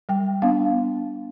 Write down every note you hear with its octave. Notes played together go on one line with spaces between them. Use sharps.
G3 G5
B3 D4 F5